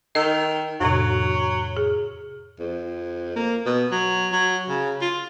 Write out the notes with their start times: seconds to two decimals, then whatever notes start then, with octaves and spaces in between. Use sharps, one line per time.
0.15 D#3 D#5 E6
0.80 F2 A2 C3 F#3
1.77 G#4
2.60 F2
3.36 A#3
3.66 B2
3.92 F#3
4.32 F#3
4.69 C#3
5.01 F4